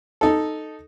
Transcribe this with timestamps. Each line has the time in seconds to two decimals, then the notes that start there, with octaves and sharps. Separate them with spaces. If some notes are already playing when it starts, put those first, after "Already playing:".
0.21 D#4 A4